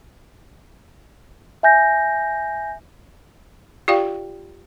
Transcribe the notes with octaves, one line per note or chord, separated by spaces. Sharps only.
E5 G#5 G6 A#6
F4 G4 D5 F5 G5